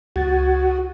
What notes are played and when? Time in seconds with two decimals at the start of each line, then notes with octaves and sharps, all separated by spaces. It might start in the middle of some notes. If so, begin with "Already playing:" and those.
0.16 C#2 F#4 G#6 A6